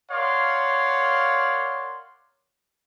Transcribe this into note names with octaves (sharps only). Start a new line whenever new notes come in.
A#4 C#5 D5 F5 F#5 C6